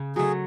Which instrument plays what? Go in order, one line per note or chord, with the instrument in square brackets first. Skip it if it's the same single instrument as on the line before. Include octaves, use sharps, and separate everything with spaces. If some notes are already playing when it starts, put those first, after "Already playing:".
Already playing: [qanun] C#3
[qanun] F#3 A3 [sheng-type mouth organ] G#4